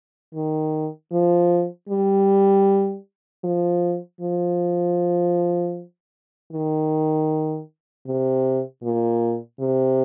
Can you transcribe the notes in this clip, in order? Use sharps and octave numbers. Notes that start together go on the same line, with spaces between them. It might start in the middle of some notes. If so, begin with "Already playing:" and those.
D#3
F3
G3
F3
F3
D#3
C3
A#2
C3